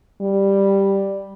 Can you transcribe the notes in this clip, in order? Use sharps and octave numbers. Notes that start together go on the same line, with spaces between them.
G3